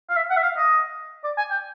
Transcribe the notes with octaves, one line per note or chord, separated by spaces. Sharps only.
F5
E5
F#5
E5
F5
D#5
D5
G#5
G5